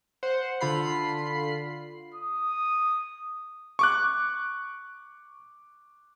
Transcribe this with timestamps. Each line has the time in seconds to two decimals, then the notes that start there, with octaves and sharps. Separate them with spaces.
0.23 C5 F#5 C6
0.61 D3 F4 B5 C7
2.14 D#6
3.79 C#6 D6 F#6